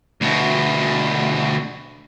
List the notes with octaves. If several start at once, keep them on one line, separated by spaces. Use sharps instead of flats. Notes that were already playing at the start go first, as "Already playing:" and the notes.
D2 B2